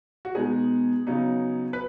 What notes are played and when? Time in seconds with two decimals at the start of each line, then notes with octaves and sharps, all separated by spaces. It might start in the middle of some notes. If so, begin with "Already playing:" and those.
0.25 F#4
0.35 B2 G#3 B3 D#4 G#4
1.07 C#3 F#3 B3 D#4
1.73 B4